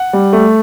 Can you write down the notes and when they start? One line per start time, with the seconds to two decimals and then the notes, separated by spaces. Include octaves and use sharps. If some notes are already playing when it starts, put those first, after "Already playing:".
Already playing: F#5
0.13 G3
0.33 A3